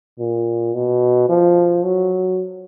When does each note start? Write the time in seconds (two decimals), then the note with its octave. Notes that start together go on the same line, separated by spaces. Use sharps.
0.19 A#2
0.74 B2
1.29 F3
1.84 F#3